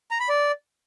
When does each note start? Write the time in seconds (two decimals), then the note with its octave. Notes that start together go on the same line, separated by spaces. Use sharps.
0.11 A#5
0.20 B5
0.29 D5